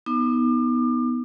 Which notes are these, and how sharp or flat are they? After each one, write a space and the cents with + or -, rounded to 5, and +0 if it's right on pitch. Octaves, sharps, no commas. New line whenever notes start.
B3 +0 D#4 +15 D6 +35